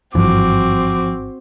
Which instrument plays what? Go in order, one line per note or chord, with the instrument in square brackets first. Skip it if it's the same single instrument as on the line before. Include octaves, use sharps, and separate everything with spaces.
[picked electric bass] G#1 G2 E3 [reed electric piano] F3 [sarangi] C4 [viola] F#4 D6